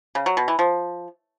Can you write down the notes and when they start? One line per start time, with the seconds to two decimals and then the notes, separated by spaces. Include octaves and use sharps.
0.15 C#3
0.26 F#3
0.37 B2
0.48 E3
0.59 F3